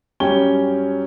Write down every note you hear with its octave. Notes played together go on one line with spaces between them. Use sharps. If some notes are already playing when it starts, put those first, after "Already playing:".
F#2 G3 C#4 G5 G7